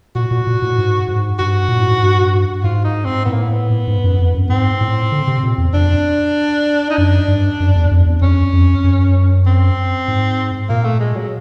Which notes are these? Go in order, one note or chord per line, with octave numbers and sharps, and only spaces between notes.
A#2 F#4
A#2
A#2
A2
G#2
G#2
G2 F#4
A#2
A2
G#2
G2
G#2 F4
D#4
C4
A2 B3
A#3
B3
G#2
F#2
F2
F#2
G#2 C4
A2
D3
C3
A#2
E2
F2 D4
D#4
F#2 D4
G2
F#2
E2
F2
E2
F2 C#4
F2
F#2
C4
G#2
A#2 A#3
A3
G#3
F#3